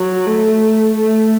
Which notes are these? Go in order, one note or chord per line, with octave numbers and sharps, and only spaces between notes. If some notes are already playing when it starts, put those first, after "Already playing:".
Already playing: F#3
A3
A3